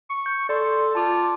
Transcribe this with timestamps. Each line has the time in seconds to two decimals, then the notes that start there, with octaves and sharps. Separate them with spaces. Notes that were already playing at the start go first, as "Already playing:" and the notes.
0.10 C#6
0.26 G6
0.49 A4 D5 C6
0.95 F4 A5 D6